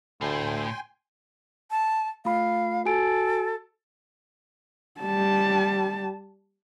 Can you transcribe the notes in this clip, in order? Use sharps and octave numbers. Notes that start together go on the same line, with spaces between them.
D2 A2 G5 G#5 C6
A5
A3 F4 F5 B5
F#4 A4 G#5 D7
G3 A5